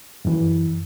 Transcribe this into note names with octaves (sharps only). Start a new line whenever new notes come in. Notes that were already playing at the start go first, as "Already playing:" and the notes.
F#2 E3